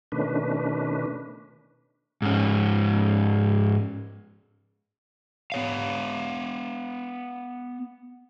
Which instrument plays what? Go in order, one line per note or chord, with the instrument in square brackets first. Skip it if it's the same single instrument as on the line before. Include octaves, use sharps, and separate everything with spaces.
[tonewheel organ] B2 D#3 A3 C#4 D4 B4
[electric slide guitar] G#2 C#4
B3 C#5 F5